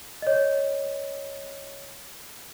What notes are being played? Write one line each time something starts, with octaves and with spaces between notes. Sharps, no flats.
C#5 D#5